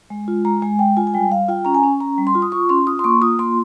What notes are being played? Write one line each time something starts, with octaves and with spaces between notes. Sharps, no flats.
G#3
F4
G#3 A#5
G#3 G#5
G#3 G5
F4 G#5
G#5
G3 G5
G3 F5
F4 G5
C#4 A#5
G#5
C#4
C#4 A#5
G3
C6
F4
D#6
F4 C#6
C#4 C6
F4 D#6
C6
A#3 C#6
F4 D#6
A#3 C6